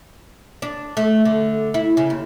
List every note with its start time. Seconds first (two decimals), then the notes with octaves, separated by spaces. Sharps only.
0.62 D4
0.97 A3
1.25 D3
1.74 E4
1.97 C#3
2.10 D#2